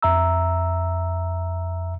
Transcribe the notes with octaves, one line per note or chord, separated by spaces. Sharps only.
F2 E5 A#5 E6